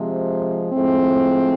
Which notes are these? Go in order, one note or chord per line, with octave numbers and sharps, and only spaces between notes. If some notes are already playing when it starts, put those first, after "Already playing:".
Already playing: C3 F3 G#3
A2 F3 G#3 C4